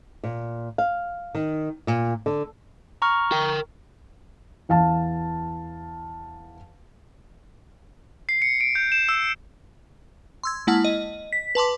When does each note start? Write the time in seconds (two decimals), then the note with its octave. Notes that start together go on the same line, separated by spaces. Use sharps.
0.24 A#2
0.78 F5
1.35 D#3
1.87 A#2
2.26 D3
3.02 A#5 C#6 F6
3.32 A#4 G5
4.69 E2 F5 A5
8.29 C7
8.42 C#7
8.61 D7
8.75 G6
8.92 E7
9.09 E6
10.43 C6 E6 G#6
10.67 G#3 A#3 E4 F#5 A5 F6
10.84 D#5
11.33 B6
11.55 B4 A5 C6 D6